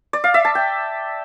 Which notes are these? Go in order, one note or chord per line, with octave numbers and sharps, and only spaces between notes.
D5
F5
E5
A5
G5